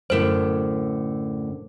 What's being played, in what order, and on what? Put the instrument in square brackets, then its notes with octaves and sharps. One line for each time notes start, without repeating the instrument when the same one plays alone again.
[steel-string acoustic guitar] F#2 A2 D3 [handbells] A#4 C5